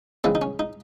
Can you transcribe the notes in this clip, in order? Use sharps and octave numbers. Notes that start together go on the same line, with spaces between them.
C#3 E3 G#3 C4
D#4
C#4
D#4